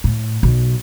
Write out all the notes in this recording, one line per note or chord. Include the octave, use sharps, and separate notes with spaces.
A2
B1